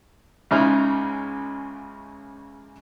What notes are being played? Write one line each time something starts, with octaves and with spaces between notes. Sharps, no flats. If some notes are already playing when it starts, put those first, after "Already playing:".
C#2 C#3 G#3 D#4 E4 F6